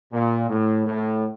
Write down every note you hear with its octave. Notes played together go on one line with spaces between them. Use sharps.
A#2
A2
A2